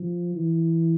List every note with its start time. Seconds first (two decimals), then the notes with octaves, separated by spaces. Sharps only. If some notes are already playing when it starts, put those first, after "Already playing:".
Already playing: F3
0.35 E3